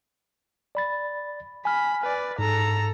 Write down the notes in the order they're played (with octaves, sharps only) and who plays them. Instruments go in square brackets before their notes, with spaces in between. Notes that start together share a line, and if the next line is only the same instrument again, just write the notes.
[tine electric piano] D5 B5 A6
[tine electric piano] G#5 F6 [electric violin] B5
[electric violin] B4 D5
[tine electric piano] G#2 [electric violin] A4 A#5